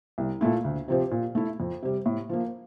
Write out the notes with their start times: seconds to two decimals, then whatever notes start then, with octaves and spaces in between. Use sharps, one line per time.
0.18 C2
0.41 A#2 A3 E4
0.64 D2
0.88 C3 F3 C4 G4
1.11 A#2
1.35 A3 E4
1.60 F2
1.83 C3 G3
2.06 A2
2.29 F3 A#3